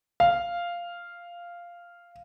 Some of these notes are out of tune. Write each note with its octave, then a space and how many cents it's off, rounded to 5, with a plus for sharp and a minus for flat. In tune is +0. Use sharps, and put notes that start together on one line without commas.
F5 -5